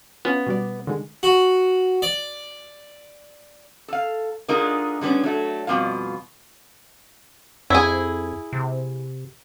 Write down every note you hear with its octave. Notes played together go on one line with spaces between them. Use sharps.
B3 C#4 F4
B2 G3 D5
D3 D#3 G#3
F#4
D5
A4 F5
D3 G#3 D#4 F4 G#4 A#4
D3 G3 A#3 B3 C#4
F#3 A3
F2 B2 G3 F4 F5
F2 E4 G#4
C3